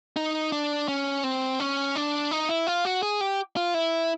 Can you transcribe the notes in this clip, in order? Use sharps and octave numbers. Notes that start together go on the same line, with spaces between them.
D#4
D4
C#4
C4
C#4
D4
D#4
E4
F4
F#4
G#4
G4
F4
E4